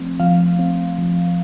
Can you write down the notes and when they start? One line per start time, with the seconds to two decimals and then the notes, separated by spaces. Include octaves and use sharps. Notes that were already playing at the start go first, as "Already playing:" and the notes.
Already playing: F3 A3 C4
0.20 F3 F5
0.59 C4
0.99 F3